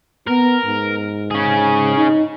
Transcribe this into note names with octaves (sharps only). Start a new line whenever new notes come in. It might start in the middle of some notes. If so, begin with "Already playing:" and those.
B3 A#4
G#2
C#4 G#4
D#4